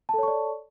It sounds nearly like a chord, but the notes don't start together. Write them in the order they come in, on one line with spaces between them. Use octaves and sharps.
A5 A4 C#5 C#6 D5